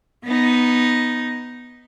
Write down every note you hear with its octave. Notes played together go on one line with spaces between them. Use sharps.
B3 D#4